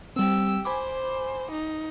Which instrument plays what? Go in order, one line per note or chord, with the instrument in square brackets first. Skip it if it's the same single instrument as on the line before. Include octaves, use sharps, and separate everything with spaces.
[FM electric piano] G3 C4 [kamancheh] G4 E6
[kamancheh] C5 [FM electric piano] G#5 B5 D6
[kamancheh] D#4